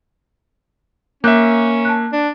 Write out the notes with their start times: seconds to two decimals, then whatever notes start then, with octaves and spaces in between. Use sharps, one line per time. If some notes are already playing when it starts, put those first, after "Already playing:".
1.24 A#3 C#4 E5 D6 F#6 G6
1.85 A5 F#6
2.13 D4